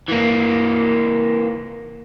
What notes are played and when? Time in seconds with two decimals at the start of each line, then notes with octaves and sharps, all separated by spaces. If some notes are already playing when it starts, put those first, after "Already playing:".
0.09 E3 A#3